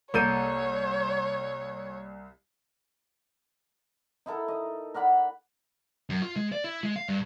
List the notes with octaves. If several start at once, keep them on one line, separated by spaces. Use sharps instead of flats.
C2 A#3 A4 C#5 G6 D#7
D#4 E4 A4 A#4
D#5
A#4 D5 F#5 B5
F#2
F4
G#3
D5
E4
G#3
F5
G2